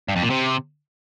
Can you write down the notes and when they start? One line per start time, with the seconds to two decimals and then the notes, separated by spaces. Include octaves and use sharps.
0.08 G2
0.16 F2
0.23 A#2
0.30 C3